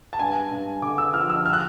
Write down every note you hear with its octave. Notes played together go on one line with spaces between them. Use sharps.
A5
G2 G#5
G2
D3 D6
E6
F3 F6
E6
F6
F#6